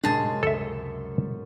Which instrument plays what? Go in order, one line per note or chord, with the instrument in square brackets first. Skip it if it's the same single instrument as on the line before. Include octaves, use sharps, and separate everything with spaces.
[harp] F#2 C3 G#3 [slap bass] A2 D4 [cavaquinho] G#4 A5
[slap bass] C#2 [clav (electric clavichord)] A4 E5